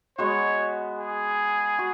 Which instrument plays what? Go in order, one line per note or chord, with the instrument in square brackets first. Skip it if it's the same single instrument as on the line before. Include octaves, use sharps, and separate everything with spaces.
[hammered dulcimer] G#3 B3 F#4 [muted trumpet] C#5
[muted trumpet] G#4
[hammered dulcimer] F#4